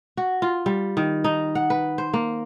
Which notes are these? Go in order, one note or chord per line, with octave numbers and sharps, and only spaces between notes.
F#4
F4
G3
D#3
D#4
F#5
B4
C5
A#3